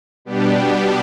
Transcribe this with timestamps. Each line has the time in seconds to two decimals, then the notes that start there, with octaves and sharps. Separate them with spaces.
0.25 B2 G3 B3 D4 G4